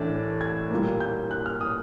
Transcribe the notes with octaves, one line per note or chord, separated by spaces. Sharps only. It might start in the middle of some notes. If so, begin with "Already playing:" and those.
Already playing: A2 E3 A3 D4 A6
G#6
A#2 G3 A#3
G6
F#6
F6
D#6